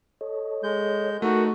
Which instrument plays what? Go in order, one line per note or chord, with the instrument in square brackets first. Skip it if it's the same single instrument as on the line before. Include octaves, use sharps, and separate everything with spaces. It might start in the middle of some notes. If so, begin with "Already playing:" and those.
[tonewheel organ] A4 C#5 D#5
[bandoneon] G#3 G6
[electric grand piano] A3 D#4 [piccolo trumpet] F#4 [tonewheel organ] A#4